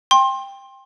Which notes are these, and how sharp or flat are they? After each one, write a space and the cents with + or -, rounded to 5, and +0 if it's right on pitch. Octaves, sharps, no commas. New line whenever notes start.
G5 +15 C6 +25